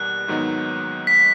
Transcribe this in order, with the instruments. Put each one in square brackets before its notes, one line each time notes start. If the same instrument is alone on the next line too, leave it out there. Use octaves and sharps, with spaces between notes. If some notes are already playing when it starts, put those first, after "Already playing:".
Already playing: [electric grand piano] E2 B2 G3 A#3 [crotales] F#6
[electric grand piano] G#2 D#3 F#3 B3 D#4
[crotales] B6